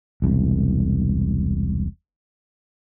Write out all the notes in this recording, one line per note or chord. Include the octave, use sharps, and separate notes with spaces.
E1 C2